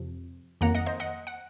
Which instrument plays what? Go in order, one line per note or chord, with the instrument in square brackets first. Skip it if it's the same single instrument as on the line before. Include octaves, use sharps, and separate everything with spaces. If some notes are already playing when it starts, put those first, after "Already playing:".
Already playing: [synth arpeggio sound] F2 C3 F3
F2 D#3 F#3 A#3 F#5 A#5
D#5 F#5
C5 D#5
D#5 F#5
F#5